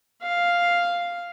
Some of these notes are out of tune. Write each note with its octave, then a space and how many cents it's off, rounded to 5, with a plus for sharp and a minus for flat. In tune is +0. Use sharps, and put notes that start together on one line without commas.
F5 +0